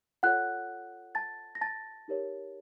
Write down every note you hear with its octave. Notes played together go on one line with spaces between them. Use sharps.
F4 A4 C#5 F#5 F#6
A5 A6
A#6
A5 A6
D#4 G4 A#4 C#5